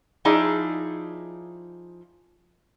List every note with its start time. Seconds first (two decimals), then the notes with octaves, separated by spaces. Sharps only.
0.25 F3 D#4 E4 G#4 D5